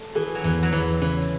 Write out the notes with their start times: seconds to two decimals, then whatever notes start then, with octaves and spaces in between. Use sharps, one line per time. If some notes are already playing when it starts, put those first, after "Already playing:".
Already playing: A3
0.15 E3 G#4
0.35 F#3
0.44 E2 E3
0.63 F#3
0.73 E2 E3
1.01 C#3 E3